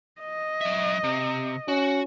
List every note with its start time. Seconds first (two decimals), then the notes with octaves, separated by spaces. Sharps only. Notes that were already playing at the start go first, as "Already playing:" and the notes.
0.21 D#5
0.61 F#3 E5
1.03 C3
1.68 C#4 F#4